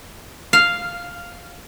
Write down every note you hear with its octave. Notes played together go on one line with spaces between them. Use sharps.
F5